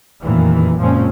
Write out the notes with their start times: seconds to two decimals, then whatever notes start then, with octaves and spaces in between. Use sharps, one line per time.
0.22 F1 F#2 A#2 D#3 E3
0.79 F#1 A#2 F3 G#3 C4 C#4